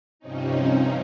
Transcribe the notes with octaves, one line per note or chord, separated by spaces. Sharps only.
G2 C3 F3 C4 C#4 D#4